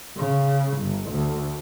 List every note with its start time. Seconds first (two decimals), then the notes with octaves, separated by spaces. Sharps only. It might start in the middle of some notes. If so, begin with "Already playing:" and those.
0.17 C#3
0.78 G1
1.10 D2